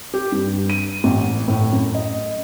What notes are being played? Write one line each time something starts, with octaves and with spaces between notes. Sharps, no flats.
G4
G2
D#7
A1
A2
F#2
D#5